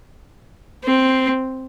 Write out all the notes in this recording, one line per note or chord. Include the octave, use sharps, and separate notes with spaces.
C4